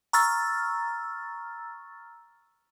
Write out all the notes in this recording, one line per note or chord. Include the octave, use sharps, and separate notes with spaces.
A#5 C#6 E6 F6 A6